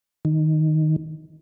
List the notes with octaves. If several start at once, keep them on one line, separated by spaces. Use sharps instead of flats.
D#3